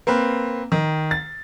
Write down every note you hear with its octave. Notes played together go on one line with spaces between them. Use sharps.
A#3 C4 B4
D#3
A6